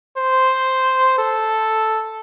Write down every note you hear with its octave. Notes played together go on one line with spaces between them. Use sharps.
C5
A4